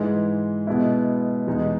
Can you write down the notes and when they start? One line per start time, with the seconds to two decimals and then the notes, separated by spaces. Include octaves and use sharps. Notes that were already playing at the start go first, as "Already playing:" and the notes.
Already playing: G#2 E3 G#3
0.67 B2 G#3 B3 E4
1.47 E2 B2 G#3 D#4